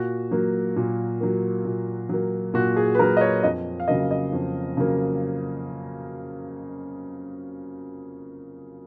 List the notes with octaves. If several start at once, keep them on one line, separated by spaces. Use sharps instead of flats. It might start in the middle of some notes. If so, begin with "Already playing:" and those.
Already playing: A#2 F#4
F#3 A#3
A#2
F#3 A#3
A#2
F#3 A#3
A#2 F#4
G#4
B4
F#3 A#3 A#4
D#5
C#5
F2 D#5
F5
C#3 F#3 A#3 D#5
D#5
F2
C#3 F#3 A#3